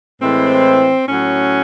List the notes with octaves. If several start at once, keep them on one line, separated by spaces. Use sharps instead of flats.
A2 E3 G#3 C4
A2 F#3 C#4